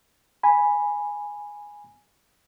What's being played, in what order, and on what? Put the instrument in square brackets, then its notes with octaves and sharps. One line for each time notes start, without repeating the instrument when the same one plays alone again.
[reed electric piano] G#5 B5